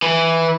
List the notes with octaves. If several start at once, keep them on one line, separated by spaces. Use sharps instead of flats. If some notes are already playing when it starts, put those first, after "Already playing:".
E3